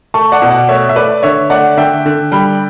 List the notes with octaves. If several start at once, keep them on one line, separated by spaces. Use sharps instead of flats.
A3 A5 C#6
D5 F#5
B2
D5 F#5
A3 C#5 E5
E5
A3 B4 D5
D3 C#5 E5
A3 D5 F#5
D3 E5 G5
D3
G3 G5 B5